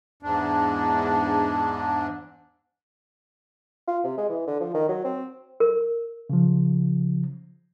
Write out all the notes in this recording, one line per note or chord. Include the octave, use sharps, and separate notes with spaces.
E2 G#2 D4
F4
C3
G#3
E3
D3
F3
D#3
F#3
C4
A#4
C#3 F3